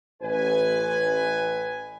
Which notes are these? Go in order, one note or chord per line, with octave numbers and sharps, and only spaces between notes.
A1 B4 G#5